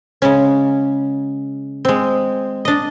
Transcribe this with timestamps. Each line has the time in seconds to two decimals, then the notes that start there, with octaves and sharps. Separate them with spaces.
0.22 C#3 G#3 C#4
1.85 G#3 C4
2.65 D4 D#5